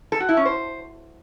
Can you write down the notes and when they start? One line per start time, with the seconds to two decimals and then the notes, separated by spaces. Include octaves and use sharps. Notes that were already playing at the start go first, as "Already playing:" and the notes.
0.12 A4
0.20 F#4
0.29 E4
0.37 C#4
0.45 C5